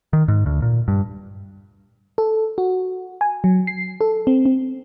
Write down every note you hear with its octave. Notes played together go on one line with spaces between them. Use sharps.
D#3
G#2
D2
A#2
G2
A4
F#4
G#5
F#3
C7
A4
C4
C4